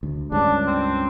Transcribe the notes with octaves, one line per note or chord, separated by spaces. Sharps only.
D2
C#2 G2 C#3 D4
C4